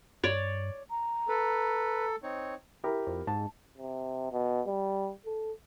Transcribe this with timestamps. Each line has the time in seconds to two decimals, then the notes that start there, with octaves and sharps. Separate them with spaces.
0.24 G2 C#5 D5
0.90 A#5
1.29 A4 B4
2.23 C4 D#4 C#5
2.84 E4 G4 A#4
3.07 F2
3.27 G#2 A5
3.78 C3
4.32 B2
4.66 G3
5.26 A4